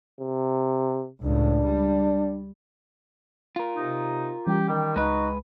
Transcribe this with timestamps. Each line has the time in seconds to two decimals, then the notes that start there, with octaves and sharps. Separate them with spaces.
0.20 C3
1.25 C#2 A2 D4
1.66 G3
3.56 F4 A#4
3.76 C3 D#4
4.47 E3 G3 C#4 G4
4.68 D#3 G3 G5
4.96 C#2 G#3 D#4 F#4 B4